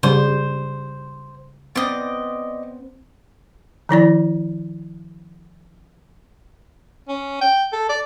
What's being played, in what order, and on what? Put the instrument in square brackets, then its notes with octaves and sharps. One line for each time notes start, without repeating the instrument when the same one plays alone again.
[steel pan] C#3 G3 [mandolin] C5
[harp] B3 C4 [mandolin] D5 D#5
[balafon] D#3 F3 E4 D5
[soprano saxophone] C#4
G5
A4
D5